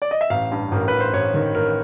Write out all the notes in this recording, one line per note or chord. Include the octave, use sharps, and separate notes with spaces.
D5
D#5
E5
A1 F5
G2
A1 A#4
A1 B4
C5
A1 C#5
D#3
A1 A#4